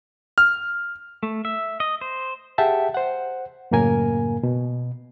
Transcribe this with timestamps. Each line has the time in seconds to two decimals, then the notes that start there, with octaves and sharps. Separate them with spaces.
0.38 F6
1.23 A3
1.45 E5
1.80 D#5
2.01 C5
2.58 G4 G#4 E5 F#5 G5 A5
2.94 C5 F#5
3.71 F#2 A2 C#3 A#3 A#4 G#5
4.43 B2